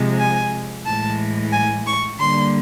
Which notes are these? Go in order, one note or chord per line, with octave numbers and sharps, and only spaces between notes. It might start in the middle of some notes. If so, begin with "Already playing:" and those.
Already playing: C3 F3 G#3
G#5
A2 E3 G#3 A5
G#5
C#6
D3 G3 A#3 C6